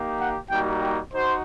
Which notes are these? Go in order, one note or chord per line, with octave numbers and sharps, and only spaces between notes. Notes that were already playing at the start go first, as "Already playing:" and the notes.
Already playing: A#3 D#4 G4
F#5
G3 A#3 D#4 F#4 G5
G5
D#4 F#4 C5